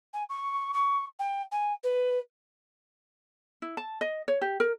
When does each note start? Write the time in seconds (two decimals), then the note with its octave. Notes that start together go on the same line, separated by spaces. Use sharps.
0.13 G#5
0.29 C#6
0.73 C#6
1.19 G5
1.51 G#5
1.83 B4
3.62 E4
3.77 A5
4.01 D#5
4.28 C#5
4.41 G4
4.60 A#4